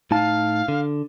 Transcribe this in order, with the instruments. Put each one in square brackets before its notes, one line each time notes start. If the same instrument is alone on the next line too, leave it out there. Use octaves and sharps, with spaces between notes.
[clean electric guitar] A2 D#4 A5 [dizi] F5
[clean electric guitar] D3